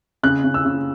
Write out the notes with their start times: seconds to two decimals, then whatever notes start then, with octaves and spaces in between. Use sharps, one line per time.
0.23 C#3 F#6
0.44 C#3
0.54 E6
0.65 C#3